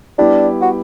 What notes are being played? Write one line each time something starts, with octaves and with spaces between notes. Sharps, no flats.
G3 B3 D4 E4 G4
F#4